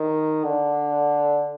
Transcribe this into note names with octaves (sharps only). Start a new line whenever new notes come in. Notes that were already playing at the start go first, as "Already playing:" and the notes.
Already playing: D#3
D3